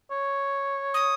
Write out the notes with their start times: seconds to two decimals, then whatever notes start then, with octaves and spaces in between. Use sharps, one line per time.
0.11 C#5
0.94 D#6